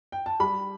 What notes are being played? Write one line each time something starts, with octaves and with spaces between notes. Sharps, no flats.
G5
A5
G3 B5